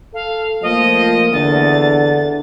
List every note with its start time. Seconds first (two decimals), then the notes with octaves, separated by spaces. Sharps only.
0.14 A4 F5
0.63 F3 A3 A#3 D#5
1.33 E2 D3 A6